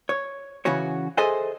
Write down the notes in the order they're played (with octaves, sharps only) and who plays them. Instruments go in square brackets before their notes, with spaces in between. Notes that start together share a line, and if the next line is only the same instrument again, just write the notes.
[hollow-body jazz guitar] C#5
C#3 E3 C#4 F#4 C#5
G#4 A4 C5 D#5 E5 G#5